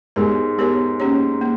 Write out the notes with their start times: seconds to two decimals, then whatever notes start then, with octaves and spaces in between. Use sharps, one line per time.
0.16 G#2 G#3 B3 G4 A#4 C#5
0.58 G#3 B3 G4 A#4 C#5
1.00 A#3 C#4 G4 C#5
1.41 A#3